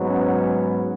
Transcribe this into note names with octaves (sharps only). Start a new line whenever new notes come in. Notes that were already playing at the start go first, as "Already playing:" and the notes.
Already playing: G#2 F#3 B3
C#4